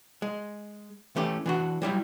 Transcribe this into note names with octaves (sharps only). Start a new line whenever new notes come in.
G#3
E3 A3 C#4 G4
E3 D4 F#4
F#3 G3 E4 G5